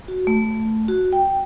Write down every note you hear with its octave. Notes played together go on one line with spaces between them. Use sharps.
F#4
A3
F#4
G5